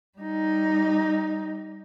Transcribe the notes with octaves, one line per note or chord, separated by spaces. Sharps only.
G3 D#4